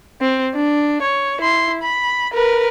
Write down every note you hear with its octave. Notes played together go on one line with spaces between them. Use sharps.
C4
D4
C#5
E4 C6
B5
A#4 B4